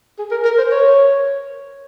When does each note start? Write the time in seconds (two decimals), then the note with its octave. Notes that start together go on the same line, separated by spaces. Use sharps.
0.19 G#4
0.31 A#4
0.45 A#4
0.58 C5
0.71 C#5